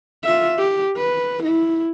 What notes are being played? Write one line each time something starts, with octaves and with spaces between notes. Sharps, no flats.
F4 E5
G4
B4
E4